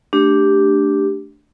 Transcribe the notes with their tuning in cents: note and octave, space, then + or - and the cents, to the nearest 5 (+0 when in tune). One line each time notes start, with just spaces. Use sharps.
A3 +0 D4 +0 G4 +0